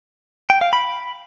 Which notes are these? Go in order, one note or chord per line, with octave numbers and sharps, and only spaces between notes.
G5
F5
B5